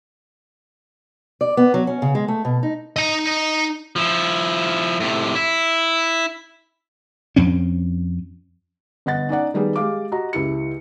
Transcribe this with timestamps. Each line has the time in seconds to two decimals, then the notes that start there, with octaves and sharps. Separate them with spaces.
1.41 D5
1.57 B3
1.74 F#3
1.87 C#4
2.02 C#3
2.15 G#3
2.28 A3
2.45 B2
2.63 D#4
2.96 D#4 D#5
3.96 F3 E4
5.00 A2 C3
5.35 E4
7.36 F2 C4 C#4
9.06 G1 D#5 F#5 A6
9.29 C#4 D#4 D5 F#5
9.54 D#3 G3 B3 G4 G#4
9.76 G#3 G4 F5 D6
10.12 F#4 G4 D#5 A#5
10.33 C#2 E4 G4 C#7